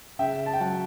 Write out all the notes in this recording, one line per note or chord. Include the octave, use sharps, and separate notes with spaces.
C#3 E5 G5
A5
G5
F#3 F#5 A5